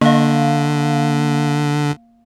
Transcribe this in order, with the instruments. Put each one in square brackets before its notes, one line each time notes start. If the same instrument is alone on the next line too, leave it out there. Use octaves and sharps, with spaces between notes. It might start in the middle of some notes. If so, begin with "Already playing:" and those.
[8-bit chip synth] D3 [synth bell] A#3 F5